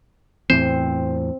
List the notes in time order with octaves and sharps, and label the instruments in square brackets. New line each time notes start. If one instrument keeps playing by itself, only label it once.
[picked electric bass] E2 A2 E3 [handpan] C4 [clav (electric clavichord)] C5